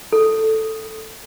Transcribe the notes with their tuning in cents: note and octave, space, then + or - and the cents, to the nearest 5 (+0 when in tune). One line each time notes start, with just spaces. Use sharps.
A4 +0